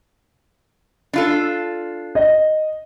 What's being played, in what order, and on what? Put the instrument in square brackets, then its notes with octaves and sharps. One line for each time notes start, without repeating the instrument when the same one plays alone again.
[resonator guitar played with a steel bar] D4 F4 A4
[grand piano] D#5